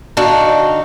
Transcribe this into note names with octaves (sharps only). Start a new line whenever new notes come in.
D3 D4 D#4 F#4 F5